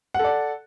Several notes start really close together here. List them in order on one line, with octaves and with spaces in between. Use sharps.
F#5 A4 D5